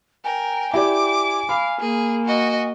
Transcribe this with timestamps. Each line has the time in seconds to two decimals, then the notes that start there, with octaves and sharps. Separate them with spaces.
0.25 A#4 G5 G#5
0.74 E4 G4 D5 D6
1.49 F5 B5
1.80 A#3 G#4
2.26 F#4 D#5